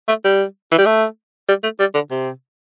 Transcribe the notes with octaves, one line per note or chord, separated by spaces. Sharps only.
A3
G3
E3
G3
A3
G3
A3
G3
D3
C3